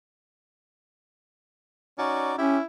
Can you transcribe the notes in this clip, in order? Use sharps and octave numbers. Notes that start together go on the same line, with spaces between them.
C#4 D#4 F#4 D5
C#4 E4 G4